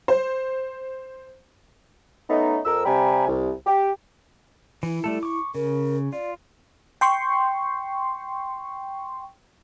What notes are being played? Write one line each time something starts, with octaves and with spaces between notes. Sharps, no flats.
C5
A3 B3 C#4 D#4
F2 A#4 E6
C3 G3 G5 G#5 A#5 B5
C2
G4
E3 E4
G3 A3 A4
C#6 D6
C#3 A#4
F4 D5
G5 C6 C#6